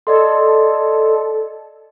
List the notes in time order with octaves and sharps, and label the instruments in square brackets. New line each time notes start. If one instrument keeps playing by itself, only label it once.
[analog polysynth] A4 [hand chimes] D5 D#5 C6